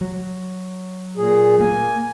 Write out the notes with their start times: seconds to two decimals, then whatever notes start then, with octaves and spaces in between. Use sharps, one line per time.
0.01 F#3
1.17 A#2 G#4
1.60 A#3 G#5